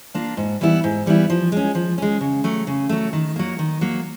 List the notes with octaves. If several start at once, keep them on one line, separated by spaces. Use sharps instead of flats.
A#3 D4 F4
G#2
E3 G3 B3 E4
G#2
E3 G3 B3 E4
F3
G#3 C#4
F3
G#3 C#4
C#3
F#3 A3
C#3
F#3 A3
D#3
F#3 A#3
D#3
F#3 A#3